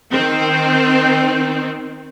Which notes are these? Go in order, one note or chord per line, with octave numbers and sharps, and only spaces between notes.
D#3 C4